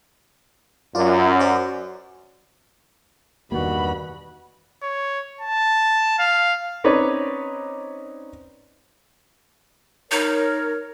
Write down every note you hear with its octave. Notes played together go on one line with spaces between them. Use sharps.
F#2 F4 D5
F#4 C5 D5
E2 G2 B2 D#3 A#3 F#4 B5
C#5
A5
F5
C4 C#4 D#4 B4 C#5 D5
D#4 A#4 C#5